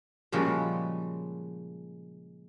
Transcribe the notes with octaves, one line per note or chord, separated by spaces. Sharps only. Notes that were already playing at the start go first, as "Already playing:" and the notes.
A#2 C#3 F3 G3 G#3 F#4